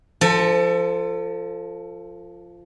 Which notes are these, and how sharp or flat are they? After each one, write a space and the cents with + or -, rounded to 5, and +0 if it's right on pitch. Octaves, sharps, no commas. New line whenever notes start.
F3 -10 A4 +25